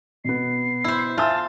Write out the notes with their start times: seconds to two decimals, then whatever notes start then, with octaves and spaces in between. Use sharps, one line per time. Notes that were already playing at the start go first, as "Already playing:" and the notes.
0.25 B2 B3 C7
0.84 E4 C5
1.18 F4 E5 G#5 A5 E6